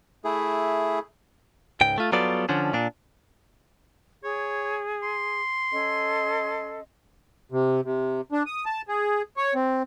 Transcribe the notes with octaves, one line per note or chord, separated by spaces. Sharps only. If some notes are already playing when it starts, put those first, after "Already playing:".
A3 E4 G#4
C#2 G#2 G5
A3 F4
F#3 G3 B3 F4 A4 D5
D3 F3 C#4 D4
A#2 D4
G#4 C#5
C6
C#4 A4 D#5
C3
C3
D4
D#6
A5
G#4
C#5
C4